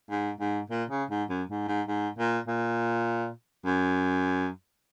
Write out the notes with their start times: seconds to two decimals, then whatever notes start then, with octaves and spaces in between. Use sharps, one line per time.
0.11 G#2
0.40 G#2
0.70 A#2
0.90 C#3
1.10 G#2
1.29 F#2
1.49 G#2
1.68 G#2
1.88 G#2
2.18 A#2
2.47 A#2
3.66 F#2